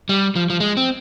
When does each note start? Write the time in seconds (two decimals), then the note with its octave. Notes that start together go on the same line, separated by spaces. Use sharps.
0.09 G3
0.36 F3
0.50 F3
0.60 G#3
0.77 C4